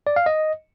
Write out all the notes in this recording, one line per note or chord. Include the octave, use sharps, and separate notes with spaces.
D5
F5
D#5